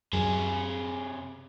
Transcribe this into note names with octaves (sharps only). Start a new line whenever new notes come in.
F#2 C3 F#3 G#4